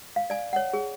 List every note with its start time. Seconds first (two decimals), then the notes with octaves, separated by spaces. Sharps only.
0.16 F5
0.30 D5 G#5
0.53 C#5 F#5
0.73 G#4